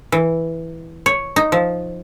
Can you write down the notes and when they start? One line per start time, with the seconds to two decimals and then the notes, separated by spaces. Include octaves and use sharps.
0.12 E3
1.06 C#5
1.36 D#4
1.52 F3